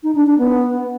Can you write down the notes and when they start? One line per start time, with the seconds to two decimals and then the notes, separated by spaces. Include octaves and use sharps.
0.04 D#4
0.15 D4
0.27 D4
0.38 B3